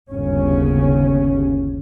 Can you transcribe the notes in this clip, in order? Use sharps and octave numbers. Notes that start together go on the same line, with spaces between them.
G1 D#2 C#3 C#4